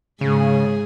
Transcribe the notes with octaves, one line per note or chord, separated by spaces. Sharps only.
G#2 C#3 G#4